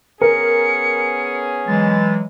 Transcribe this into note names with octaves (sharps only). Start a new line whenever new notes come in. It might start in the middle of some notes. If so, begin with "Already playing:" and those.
B3 C#4 G#4 A#4 C#7
E3 F#3 G#3 A6